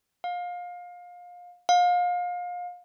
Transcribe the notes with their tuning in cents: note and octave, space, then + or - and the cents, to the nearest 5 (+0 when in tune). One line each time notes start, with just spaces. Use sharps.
F5 +25
F5 +30